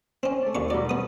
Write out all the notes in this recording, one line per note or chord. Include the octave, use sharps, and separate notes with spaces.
C4 C#4
A3 D5
D#2 A#2 C#6
G2 B2 F#3 D5
B3 D#6